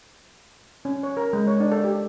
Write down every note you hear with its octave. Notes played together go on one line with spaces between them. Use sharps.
C#4
C#5
A#4
G#3
C#5
D4
A4
G4